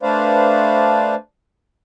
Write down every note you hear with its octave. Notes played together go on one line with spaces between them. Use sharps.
A3 D4 B4 C5 D5 F5